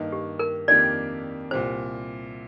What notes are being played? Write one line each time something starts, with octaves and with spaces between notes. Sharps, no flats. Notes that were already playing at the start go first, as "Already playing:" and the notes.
Already playing: G2 D#3 A#3 D#4
G4
A#4
F2 D#3 A#3 D4 G4 D5
C2 A#2 G3 C5